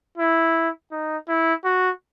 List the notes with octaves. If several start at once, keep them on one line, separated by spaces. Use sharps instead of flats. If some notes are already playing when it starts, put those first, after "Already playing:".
E4
D#4
E4
F#4